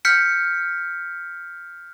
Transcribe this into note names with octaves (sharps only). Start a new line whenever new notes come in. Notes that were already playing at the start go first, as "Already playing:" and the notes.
F6 G6 B6 C#7